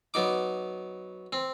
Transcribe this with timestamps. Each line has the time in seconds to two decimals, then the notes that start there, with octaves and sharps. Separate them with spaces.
0.14 F#3 B3 D#4 D6
1.33 C4